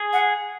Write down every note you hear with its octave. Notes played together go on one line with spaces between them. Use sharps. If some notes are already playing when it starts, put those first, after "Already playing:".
Already playing: G#4
F#5